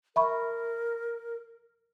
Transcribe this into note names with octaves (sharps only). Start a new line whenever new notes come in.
A#4 E5 B5 C#6